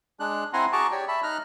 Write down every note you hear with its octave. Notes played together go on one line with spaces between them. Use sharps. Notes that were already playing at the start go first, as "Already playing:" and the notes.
G#3 D4 F#6
C4 E4 F#5 G#5 A#5 C6
F#4 G#4 A5 A#5 C#6 D6
G4 C#5 D5
E5 A5 B5
D#4 A#5 F6 F#6